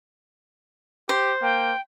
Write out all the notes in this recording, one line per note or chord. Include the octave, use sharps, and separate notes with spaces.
G4 C5
A#3 G5